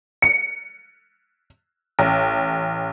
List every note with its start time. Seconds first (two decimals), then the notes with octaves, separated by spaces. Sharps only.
0.22 C#7
1.99 A1